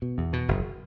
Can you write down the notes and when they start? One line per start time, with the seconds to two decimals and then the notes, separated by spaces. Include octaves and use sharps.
0.02 B2
0.18 E2
0.33 B2
0.48 F#1